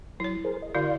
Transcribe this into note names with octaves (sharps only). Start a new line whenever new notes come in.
F#3 E4 C#5
G#4 A#4 C5
D#5
D3 E4 F#4 D5 F5 C6